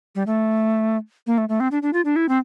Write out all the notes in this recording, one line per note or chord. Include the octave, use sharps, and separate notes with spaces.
G3
A3
A#3
A3
A3
C4
D4
D4
F4
D4
E4
C4